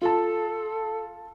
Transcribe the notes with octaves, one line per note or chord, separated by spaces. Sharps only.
F4 A4 A5